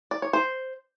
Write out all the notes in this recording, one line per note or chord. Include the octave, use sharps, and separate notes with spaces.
D5
C#5
C5